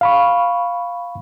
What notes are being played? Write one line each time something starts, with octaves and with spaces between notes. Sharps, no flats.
F5 B5 C#6